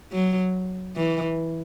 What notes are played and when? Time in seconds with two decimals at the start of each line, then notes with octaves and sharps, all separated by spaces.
0.12 F#3
0.96 E3